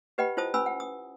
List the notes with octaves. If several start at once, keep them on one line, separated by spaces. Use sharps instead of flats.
G4 B4 D#5 F#5 G5 B5
E4 F4 C5 A5 D#6
C#4 B4 G#5 B5 E6
F#5
D#6